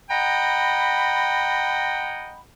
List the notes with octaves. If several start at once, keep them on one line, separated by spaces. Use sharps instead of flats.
D#5 F#5 G5 A#5 B5